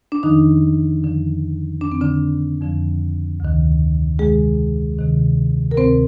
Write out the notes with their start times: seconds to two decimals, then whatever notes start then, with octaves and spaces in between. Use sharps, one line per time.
0.12 D4
0.23 F2 D3 D#3 F3 D#4
1.03 F2 D3 F3
1.81 F2 D3 F3 D4
1.92 C4
2.01 D3 D4
2.61 F2 D3 F3
3.40 D2 C3 D#3
4.19 D2 C3 D#3 G#3 G#4
4.98 D2 C3 D#3
5.71 A#4
5.77 D2 C3 D#3 C4 C5